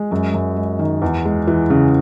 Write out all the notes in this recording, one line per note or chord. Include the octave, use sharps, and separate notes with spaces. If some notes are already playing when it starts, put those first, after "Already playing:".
Already playing: G#3
F#2
F#2
G#3
D#3
E2
G#3
E3
C#3